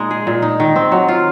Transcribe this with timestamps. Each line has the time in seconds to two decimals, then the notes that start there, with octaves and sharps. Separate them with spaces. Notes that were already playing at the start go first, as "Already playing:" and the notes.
Already playing: A#2 G#3 D#4
0.11 G#4
0.27 A#2
0.42 D#4
0.60 D#3
0.76 C4
0.92 F#3
1.08 F4